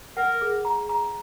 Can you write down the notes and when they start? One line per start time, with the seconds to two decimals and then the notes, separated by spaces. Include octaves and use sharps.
0.17 A#4 F#5
0.41 G#4
0.65 A#5
0.89 A#5